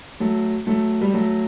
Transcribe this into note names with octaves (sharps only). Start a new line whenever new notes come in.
F#3 A3
F#3 A3
G3
F#3 A3